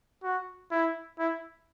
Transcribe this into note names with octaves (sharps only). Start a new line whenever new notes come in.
F#4
E4
E4